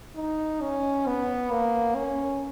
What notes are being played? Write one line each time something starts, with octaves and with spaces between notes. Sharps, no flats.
D#4
C#4
B3
A#3
C#4